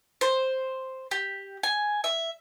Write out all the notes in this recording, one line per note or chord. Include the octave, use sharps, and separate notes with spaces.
C5
G4
G#5
E5